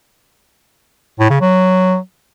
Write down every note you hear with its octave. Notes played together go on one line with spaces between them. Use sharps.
A2
C#3
F#3